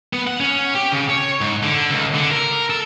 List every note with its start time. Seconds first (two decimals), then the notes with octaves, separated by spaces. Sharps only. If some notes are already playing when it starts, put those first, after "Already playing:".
0.13 B3
0.27 F#5
0.40 C#4
0.75 G4
0.92 C#3
1.10 C#5
1.41 G#2
1.63 D3
1.90 C#2
2.15 D3
2.31 A#4
2.70 A4